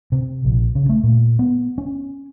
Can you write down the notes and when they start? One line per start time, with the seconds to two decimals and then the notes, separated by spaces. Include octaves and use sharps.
0.12 C3
0.45 A#1
0.75 C#3
0.89 A3
1.03 A#2
1.39 B3
1.78 C#4